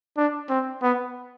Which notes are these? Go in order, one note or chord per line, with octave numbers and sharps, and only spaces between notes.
D4
C4
B3